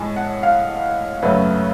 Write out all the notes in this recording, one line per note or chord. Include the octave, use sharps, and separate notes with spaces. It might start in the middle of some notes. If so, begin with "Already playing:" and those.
Already playing: A2 G#3 G#5 A5
F#5
F5
F#2 C#3 F#3 A3 B4